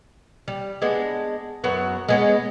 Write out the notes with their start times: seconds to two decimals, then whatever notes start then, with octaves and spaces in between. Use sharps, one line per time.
0.48 G3
0.82 G#3 B3 D4
1.64 F#2 B3 F#4
2.08 G#3 B3 C#4